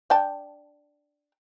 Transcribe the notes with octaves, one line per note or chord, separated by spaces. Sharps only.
D4 G5 A5